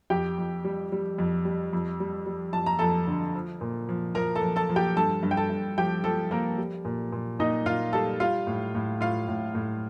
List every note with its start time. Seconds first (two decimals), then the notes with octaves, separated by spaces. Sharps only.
0.10 F2 G4 G5
0.38 F2
0.65 G3
0.92 G3
1.18 F2
1.45 G3
1.73 F2
2.00 G3
2.27 G3
2.53 F2 A5
2.66 A#5
2.79 F2 A4 A5
3.07 D3
3.35 F3
3.61 A#2
3.89 F3
4.15 F3 A#4 A#5
4.36 A4 A5
4.42 F3
4.56 A4 A5
4.70 F3
4.76 G4 G5
4.97 G2 A4 A5
5.23 G2
5.31 G5
5.37 A4 A5
5.50 G2
5.78 F3 G4 G5
6.04 F3 A4
6.31 F3 A#3 A#4
6.58 G3
6.85 A#2
7.12 A#2
7.39 A#2 D#4 D#5
7.66 A#2 F4 F5
7.93 G3 A4 A5
8.20 G3 F4 F5
8.47 A2
8.75 A2
9.01 A2 F4 F5
9.28 A2
9.55 A2